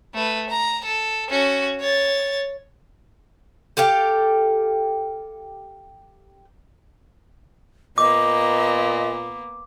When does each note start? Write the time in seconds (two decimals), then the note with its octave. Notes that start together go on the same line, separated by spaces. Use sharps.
0.14 A3 B4
0.50 A#5
0.85 A4
1.29 C#4 F#4
1.80 C#5 A6
3.77 G4 A4 F5 G5
7.98 A#2 A#3 B3 D#5 D6